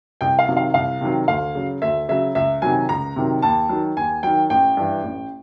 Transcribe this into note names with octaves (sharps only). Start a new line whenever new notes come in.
C2 G5
F5
C3 D#3 F#3
F5
C2 F5
C3 D#3 F#3
D2 F5
C#3 F#3
D2 E5
C#3 F#3 E5
C#2 E5
C3 D#3 F#3 G#5
C#2 A#5
C3 D#3 F#3
D#2 A5
D#3 F#3
D#2 G#5
D#3 F#3 G5
A1 G5
G2 E3
A1